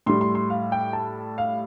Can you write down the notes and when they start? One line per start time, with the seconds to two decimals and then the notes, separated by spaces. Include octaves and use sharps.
0.06 A2 G3 C6
0.21 C6
0.35 C6
0.50 F5
0.72 G5
0.93 A5
1.38 F5